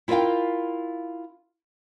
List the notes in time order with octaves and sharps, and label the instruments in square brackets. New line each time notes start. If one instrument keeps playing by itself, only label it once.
[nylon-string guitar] E4 F4 A#4 D#5 F5 G5